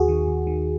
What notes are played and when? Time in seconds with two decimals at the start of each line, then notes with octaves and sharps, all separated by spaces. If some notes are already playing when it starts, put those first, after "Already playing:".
Already playing: D#2 F#4 G#4
0.08 D#3
0.28 D#2
0.47 D#3